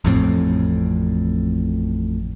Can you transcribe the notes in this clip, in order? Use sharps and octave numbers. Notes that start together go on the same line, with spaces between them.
A1 F2 A2 C4